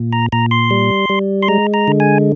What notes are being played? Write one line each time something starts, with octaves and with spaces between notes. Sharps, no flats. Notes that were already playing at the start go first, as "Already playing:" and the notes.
Already playing: A#2
A#5
A#2 A#5
C6
G3
G3
C6
G#3 A#5
A#5
D3
G#5